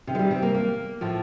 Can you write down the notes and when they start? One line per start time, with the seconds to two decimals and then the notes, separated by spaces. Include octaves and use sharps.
0.07 C3 D#3
0.15 G#3
0.19 G3
0.31 C4
0.43 A#3
0.54 A#3
1.01 A2 F3